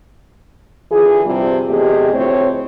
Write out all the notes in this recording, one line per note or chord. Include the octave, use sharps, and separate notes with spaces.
D3 E3 F4 G#4
G2 C3 F3 G3
E2 C3 A3 G4 G#4 D#5
D2 A2 F3 C4 C#5